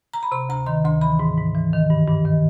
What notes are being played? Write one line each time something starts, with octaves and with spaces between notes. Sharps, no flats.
A#5
B5
C3 C6
D2 A#5
D#3 C6
D2 C6
E3 B5
G#2
G#2
E3
D#3
G2
G2
D#3